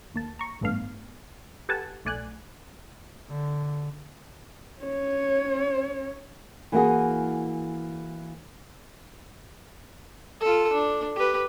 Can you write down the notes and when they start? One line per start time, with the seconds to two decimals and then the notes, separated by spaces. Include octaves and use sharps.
0.14 D#2 A#3 A5
0.39 A#5 C#6
0.61 A1 G2 A3 B3 D4 F5
1.69 G4 A4 B4 F#5 G#5 A5
2.05 B1 A3 D5 G#5 F#6
3.30 D3
4.82 C#4 C#5
6.72 E3 A#3 E4 F#4 G#4
10.41 F4 A4
10.73 D4
11.16 G4 B4